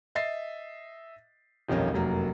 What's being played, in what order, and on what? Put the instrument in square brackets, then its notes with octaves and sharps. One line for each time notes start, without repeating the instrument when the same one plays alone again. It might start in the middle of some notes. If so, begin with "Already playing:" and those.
[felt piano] D#5 E5 A6 C7
D#1 B1 F2 C#4 A#4
F1 F#2 F#3 A#3